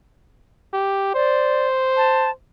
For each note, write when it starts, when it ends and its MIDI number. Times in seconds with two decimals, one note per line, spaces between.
0.73 1.14 67
1.15 2.32 72
1.15 1.67 74
1.97 2.30 81